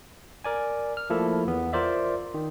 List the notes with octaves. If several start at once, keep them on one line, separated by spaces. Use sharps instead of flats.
A#4 D5 G#5
F6
F3 A3 A#3 E4 A4
E2 B3
F4 A#4 C5 D5 E5
D#3